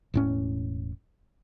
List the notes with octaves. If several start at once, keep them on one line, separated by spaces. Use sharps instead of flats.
E1 A2 C#4